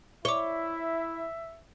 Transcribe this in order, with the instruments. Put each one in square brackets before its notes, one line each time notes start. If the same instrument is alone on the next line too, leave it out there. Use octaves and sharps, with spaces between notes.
[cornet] E4 [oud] C#5 [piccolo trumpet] E5 [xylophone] D6 G7